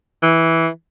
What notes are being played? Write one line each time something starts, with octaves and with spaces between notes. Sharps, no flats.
E3